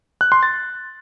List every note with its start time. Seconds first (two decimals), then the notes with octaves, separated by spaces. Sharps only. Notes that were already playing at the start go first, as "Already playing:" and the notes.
0.21 F#6
0.32 C6
0.43 A6